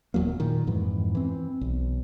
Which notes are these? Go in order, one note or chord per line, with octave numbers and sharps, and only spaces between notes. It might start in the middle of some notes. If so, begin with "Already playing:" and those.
D#1 E2 F#3 A#3
A#2 D#3
F2 G#2 E3
E3 C4
B1